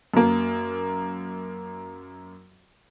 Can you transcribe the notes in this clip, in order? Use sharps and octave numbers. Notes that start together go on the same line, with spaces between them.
F#2 A#3